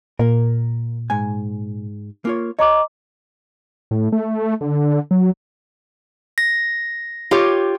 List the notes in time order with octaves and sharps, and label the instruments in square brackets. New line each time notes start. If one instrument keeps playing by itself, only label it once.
[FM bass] A#2 [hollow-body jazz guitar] A#3 A#4
[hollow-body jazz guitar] G#2 G#5
A#3 F4 C#5
[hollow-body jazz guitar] C#5 [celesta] D#5 A#5 D6
[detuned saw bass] A2
A3
D3
F#3
[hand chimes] A#6
[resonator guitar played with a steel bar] F4 G4 C#5